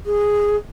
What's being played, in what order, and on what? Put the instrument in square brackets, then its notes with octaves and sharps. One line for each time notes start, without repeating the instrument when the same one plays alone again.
[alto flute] G#4